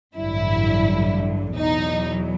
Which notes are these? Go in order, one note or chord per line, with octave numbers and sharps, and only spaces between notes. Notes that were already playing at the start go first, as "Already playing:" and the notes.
A1 G2 D3 F#3 E4
E2 B2 F#3 D#4